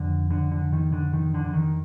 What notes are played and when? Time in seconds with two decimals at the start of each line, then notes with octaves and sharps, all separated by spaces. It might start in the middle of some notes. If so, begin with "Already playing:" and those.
Already playing: F2 D3
0.30 D3
0.52 D3
0.73 D#3
0.92 D3
1.13 D#3
1.34 D3
1.44 D3
1.53 D#3